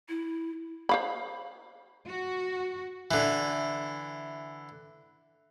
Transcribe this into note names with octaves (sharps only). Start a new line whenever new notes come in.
E4
C5 F5 B5
F#4
D3 E3